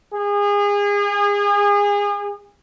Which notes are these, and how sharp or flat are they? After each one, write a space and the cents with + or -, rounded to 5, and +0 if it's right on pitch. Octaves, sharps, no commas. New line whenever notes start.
G#4 -30